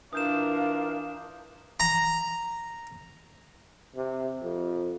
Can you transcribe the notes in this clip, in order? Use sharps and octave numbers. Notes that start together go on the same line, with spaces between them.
E3 D4 F4 A#4 F5 D#6 G6 E7
A#5
C3
F2